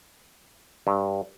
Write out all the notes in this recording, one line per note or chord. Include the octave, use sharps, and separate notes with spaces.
G2